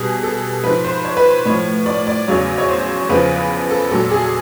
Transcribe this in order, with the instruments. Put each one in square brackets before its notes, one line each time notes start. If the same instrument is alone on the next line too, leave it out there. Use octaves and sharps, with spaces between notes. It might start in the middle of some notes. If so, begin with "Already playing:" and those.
Already playing: [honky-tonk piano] B2 G3 G#4
A4
G#2 F3 B4
C5
C#5
B4
C5
A2 F3 C#5
D5
D5
E2 C#3 F#3 C#5
C#5
C5
E2 C#3 F3 B4
A4
A#2 F#3 A4
G#4